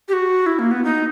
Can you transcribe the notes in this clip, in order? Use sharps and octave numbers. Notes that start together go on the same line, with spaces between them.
G4
F#4
E4
A#3
B3
D#4